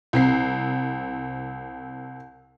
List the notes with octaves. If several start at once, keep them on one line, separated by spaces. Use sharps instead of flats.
C2 C4 C7